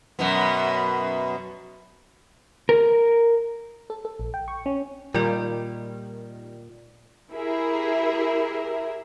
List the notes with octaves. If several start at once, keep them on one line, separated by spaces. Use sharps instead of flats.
F#2 B2 B3
A#4
A4
A4
A#1
G5
C#6
C#4
A#2 D#3 G3 F4 D5
E4 G4 G#4 A#4 E5